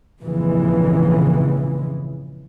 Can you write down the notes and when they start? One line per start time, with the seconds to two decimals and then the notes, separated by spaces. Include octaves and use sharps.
0.21 A#1 F2 G#2 C#3 E3 G#3